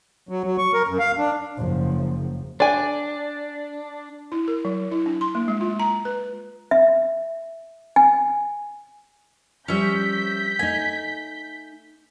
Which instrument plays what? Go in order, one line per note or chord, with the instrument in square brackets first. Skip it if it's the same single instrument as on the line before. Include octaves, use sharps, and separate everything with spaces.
[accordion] F#3
F#3
C#6
A#4
F#2
F5
D4
[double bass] F#1 F3
[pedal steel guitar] D4 [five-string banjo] D5 G#5
[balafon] E4
A#4
F#3
E4
D4
C6
A#3
G#3
F4
A#5
B4
[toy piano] E5
G#5
[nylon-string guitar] F3 G3 [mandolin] C#4 E5 [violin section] G6 B6
[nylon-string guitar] A3 D#4 [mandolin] G#5